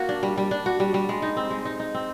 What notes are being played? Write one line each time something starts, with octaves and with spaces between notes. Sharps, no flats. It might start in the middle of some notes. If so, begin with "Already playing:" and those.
Already playing: A#3 F#4
D4
G3
G3
D4
F#4
G3
G3
G#3
D#4
C4
G#3
D#4
D#4
C4